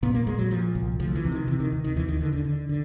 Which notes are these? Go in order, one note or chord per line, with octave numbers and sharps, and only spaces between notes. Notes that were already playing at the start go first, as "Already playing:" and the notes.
A#2 B3
A#3
A#2 G#3
F#3
A#2 F3
C2
D2 F3
E3
C3
D#3
C3 E3
D#3
D2
D#3
D#2 E3
D#3
D3 D#3
D3
D3
D3